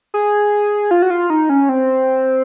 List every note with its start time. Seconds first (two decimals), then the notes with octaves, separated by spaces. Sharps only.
0.14 G#4
0.91 F4
1.02 F#4
1.10 F4
1.30 D#4
1.49 C#4
1.69 C4